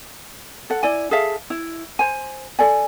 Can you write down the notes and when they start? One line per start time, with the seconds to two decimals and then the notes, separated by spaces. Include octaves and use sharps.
0.70 A4 F#5
0.83 E4 D5 G#5
1.11 G#4 A4 E5 F5
1.50 E4
1.99 C5 G#5
2.59 A4 D5 G#5